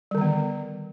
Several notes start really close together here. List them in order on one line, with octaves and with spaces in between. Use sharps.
G3 D3 D#3 B3